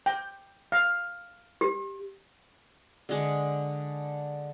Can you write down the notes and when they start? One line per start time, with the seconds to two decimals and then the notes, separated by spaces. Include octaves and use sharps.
0.06 G5
0.72 F5
1.61 G4
3.09 D3 G#3